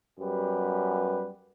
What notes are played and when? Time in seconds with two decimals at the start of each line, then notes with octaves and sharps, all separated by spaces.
0.19 F#2 G3 B3 G4 B4